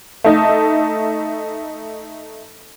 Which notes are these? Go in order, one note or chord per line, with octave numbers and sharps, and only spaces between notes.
A3 D#4